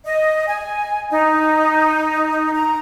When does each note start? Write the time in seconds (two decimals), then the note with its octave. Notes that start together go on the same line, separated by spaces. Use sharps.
0.05 D#5
0.47 G#5
1.10 D#4
2.53 A#5